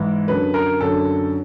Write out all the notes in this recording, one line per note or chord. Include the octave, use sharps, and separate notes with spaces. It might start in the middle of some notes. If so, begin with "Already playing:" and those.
Already playing: G#2 E3
F#2 D3 B4
A#4
F#2 D3 A4